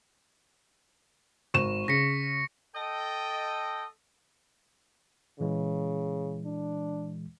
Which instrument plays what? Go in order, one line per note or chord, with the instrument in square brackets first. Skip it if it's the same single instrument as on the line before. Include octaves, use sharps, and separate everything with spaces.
[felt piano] G#1 E7 [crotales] C#6
[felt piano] C#3 [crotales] A#6 B6 C#7
[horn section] A4 D#5 G5
[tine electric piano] A#2 E3 G#3 [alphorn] C#3
[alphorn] D4